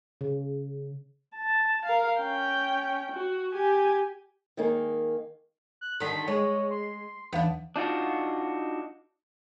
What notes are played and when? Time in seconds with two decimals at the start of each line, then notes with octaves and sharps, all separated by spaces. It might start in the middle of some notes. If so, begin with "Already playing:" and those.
0.21 C#3
1.35 A5
1.86 A#4 F5
2.20 C#4 G5
3.12 F#4
3.54 G4 G#5
4.57 D#3 G#3 A#3 D#4
5.81 F#6
6.00 D#2 D3 D#3 B6
6.28 G#3 C#5
6.71 C6
7.33 D#2 E3 B3 D4 F5
7.76 D4 D#4 F4 F#4